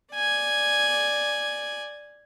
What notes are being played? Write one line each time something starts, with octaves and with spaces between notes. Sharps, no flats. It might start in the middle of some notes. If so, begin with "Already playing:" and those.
D5 G#5